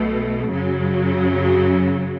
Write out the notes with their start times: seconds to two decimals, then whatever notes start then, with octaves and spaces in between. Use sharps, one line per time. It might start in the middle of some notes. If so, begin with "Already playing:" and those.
Already playing: B1 B2 A3
0.48 F#2 C#3 F#3